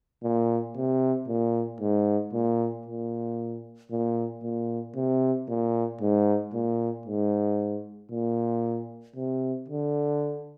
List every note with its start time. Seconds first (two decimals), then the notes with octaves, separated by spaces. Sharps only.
0.23 A#2
0.76 C3
1.28 A#2
1.81 G#2
2.33 A#2
2.86 A#2
3.91 A#2
4.43 A#2
4.96 C3
5.48 A#2
6.01 G#2
6.54 A#2
7.06 G#2
8.11 A#2
9.16 C3
9.68 D3